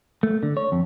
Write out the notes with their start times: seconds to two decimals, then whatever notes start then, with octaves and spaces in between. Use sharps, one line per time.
0.23 A3
0.43 D3
0.57 C#5
0.72 F2